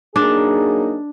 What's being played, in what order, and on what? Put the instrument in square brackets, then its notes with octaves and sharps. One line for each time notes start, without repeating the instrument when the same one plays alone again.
[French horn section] F#3 A#3 D#4 G#4 [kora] D4